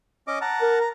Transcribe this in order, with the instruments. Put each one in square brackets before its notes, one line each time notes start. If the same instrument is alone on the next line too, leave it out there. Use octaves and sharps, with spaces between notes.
[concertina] C#4 D#5 D6
F#5 A5 A#5
[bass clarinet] A#4
[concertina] A#5